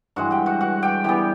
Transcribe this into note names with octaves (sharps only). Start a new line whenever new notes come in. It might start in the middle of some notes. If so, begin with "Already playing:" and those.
G2 E3 G#3 F#4 F#5
G4 G5
F#4 F#5
F#4 F#5
G4 G5
E3 G3 B3 G4 G5